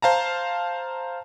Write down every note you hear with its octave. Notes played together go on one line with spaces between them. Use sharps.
C5 F5 A5 A#5